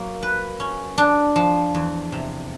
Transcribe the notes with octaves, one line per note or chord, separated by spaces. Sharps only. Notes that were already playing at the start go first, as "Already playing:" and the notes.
Already playing: F#3 A#3
B4
C#4
D4
F3
E2
C3